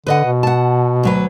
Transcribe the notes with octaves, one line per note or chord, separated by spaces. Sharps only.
D3 B4 D#5 F#5
B2
F#5 A5
D2 F#3 B4